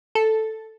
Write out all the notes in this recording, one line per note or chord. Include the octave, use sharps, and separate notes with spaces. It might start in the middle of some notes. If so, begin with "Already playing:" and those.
A4